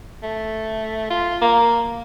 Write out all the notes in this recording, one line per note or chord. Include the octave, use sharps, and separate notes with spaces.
A3
F4
A#3